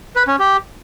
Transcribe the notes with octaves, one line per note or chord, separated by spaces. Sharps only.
B4
C#4
G4